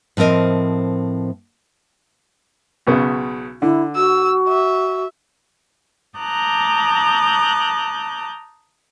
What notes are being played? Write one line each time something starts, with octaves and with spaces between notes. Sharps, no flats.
A2 F3 C4 A#4 D#5
B1 C#3 B3
D3 E4
F#4 E6
E5
A5 A#5 D6 D#6 F#6 G6